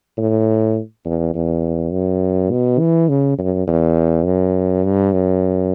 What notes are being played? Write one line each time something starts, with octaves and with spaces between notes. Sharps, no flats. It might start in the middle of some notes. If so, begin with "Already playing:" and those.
A2
E2
E2
F#2
B2
E3
C#3
F#2
E2
F#2
G2
F#2